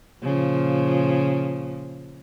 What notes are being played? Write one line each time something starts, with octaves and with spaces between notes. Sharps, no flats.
A#2 C#3 F3